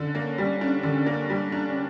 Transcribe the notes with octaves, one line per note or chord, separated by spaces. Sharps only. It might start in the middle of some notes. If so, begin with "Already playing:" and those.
Already playing: D3 C#4
A#3
G3
D4
D3
A#3
G3
D4